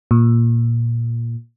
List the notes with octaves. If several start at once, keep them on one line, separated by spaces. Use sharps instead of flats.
A#2